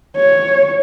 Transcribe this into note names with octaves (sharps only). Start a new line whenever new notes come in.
C#5